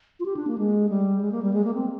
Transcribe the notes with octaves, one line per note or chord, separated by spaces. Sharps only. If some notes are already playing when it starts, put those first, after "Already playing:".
F4
G4
D4
A#3
G#3
G3
G#3
A#3
G3
G#3
A#3
C4